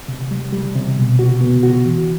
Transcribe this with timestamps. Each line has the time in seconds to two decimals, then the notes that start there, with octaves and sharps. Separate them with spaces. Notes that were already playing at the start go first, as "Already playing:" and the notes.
0.08 C3
0.31 G3
0.52 G3
0.75 C3
0.96 B2
1.19 F#4
1.41 B3
1.63 F#4
1.86 E3